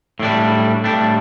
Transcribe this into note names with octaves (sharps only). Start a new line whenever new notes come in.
A2 G3 D4
A2 G3 D4